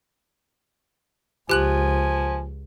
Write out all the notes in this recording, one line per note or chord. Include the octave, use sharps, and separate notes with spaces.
C#2 F3 G4 G#5 F#6 F#7